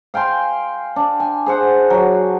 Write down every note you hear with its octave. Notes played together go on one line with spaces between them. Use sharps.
F5 G5 G#5 C6
D4
G#5
G#4 C5 F#5
F#3